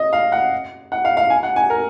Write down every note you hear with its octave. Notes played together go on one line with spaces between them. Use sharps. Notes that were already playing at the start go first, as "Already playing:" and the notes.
Already playing: D#5
F5
F#5
F#5
F5
F5
G#5
F#5
G#5
A#4